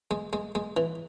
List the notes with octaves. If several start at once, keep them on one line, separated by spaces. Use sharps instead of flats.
G#3
G#3
G#3
E3